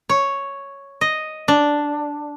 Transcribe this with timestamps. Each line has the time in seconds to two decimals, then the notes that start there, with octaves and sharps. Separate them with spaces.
0.09 C#5
1.01 D#5
1.48 D4